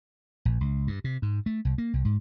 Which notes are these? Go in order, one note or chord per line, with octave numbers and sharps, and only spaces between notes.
A#1
C#2
G2
C3
G#2
A3
C2
A#3
C2
G#2